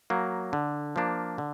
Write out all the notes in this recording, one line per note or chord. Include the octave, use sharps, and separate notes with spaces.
F#3 A#3
D3
F3 A#3 D4
D3